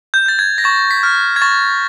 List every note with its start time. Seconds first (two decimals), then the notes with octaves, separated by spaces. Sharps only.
0.14 G6
0.26 G6 A6
0.39 G#6
0.58 A#6
0.64 C#6 A6
0.91 B6
1.03 F6
1.36 G#6
1.42 C#6 A6